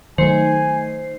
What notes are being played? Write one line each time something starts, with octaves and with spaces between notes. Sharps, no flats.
D#3 F#3 A3 D#4 C5 G#5 C7